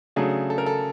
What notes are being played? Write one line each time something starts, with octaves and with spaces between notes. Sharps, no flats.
C#3 F#3 A3 D4 G#4
A4
A#4
A4